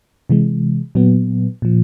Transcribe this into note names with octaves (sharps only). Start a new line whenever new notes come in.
C3 E3 G#3
A#2 F#3 B3
A#2 F3